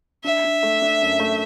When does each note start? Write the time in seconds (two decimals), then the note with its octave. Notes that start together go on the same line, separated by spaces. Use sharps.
0.24 D4 E5
0.44 D4
0.63 A3
0.82 D4
1.02 F#2
1.20 A3